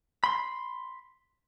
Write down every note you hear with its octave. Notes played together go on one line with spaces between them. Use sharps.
B5 C6